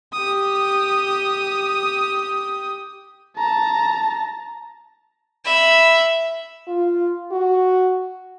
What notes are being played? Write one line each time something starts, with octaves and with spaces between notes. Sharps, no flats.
G4 D#6
A5 A#5
E5 B5
F4
F#4